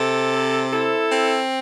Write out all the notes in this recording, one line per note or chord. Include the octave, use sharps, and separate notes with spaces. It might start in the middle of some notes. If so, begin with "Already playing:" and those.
Already playing: C3 A4
C4
E4 A4
C4